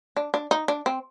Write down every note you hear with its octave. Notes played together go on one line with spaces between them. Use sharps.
D4
D4
D#4
D4
C4